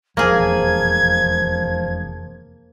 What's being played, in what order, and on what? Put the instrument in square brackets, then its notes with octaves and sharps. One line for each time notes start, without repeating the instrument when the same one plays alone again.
[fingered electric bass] F1 E2 [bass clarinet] F3 [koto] A#3 G#4 [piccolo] G#6